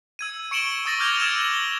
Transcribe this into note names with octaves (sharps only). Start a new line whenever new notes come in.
E6 G#6 D#7
C#6 C#7 D7 E7 F#7 G7
C#6 D#6 A6 A#6 F#7
D6 F6 G6 G#6 F7 G7
E6 G#6 D7 E7
F#7 G7